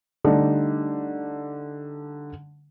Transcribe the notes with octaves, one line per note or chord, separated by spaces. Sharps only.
D3 G3 A3 D4 D#4